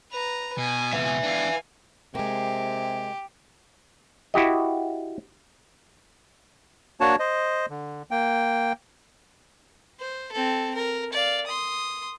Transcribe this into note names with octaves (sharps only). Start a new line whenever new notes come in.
B4 A#5
B2 G#5
C#2 B2 B4 E5
B3 D4 F5 G#5
C3 G#3 A#3 G4
E4 F#4 G4 D#5
A#3 D4 F#4 C#5 A5
C5 D#5
D3
A#3 G5
C5
C4 A4
A#4
D5 F5
C6 D#6